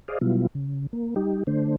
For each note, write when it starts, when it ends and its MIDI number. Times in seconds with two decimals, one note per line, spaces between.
0.08 0.18 68
0.08 0.18 72
0.08 0.18 74
0.08 0.18 75
0.08 0.18 77
0.21 0.47 47
0.21 0.47 54
0.21 0.47 55
0.21 0.47 59
0.21 0.47 64
0.21 0.47 65
0.55 0.87 49
0.93 1.14 58
1.16 1.43 55
1.16 1.43 63
1.16 1.43 67
1.47 1.76 50
1.47 1.76 57
1.47 1.76 62
1.47 1.76 72